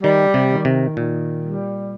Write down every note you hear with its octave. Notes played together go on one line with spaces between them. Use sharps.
D#3 G3
C3
D#3
C3
A#2 D#3
G3